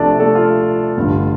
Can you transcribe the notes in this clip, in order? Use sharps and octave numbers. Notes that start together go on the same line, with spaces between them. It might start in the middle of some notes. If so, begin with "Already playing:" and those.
Already playing: C2 C3 F3 A3 D4 A4 D5
A3 A4
F4
A1 G2 D3